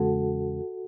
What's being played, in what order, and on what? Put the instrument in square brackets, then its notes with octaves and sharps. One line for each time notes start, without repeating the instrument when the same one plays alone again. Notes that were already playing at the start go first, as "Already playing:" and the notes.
Already playing: [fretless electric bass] E2 C#3 G#3 [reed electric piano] F#4 A4